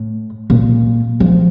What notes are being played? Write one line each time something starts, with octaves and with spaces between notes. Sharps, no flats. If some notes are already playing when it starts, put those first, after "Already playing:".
Already playing: A2
A#2
F3